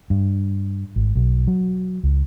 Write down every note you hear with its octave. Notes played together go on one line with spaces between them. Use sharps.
G2
G#1
B1
F#3
C#2